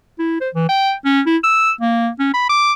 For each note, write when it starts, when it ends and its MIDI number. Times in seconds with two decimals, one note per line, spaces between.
0.19 0.38 64
0.41 0.49 72
0.55 0.69 52
0.69 0.93 79
1.05 1.21 61
1.26 1.37 64
1.44 1.71 88
1.81 2.10 58
2.20 2.32 61
2.34 2.49 83
2.49 2.73 86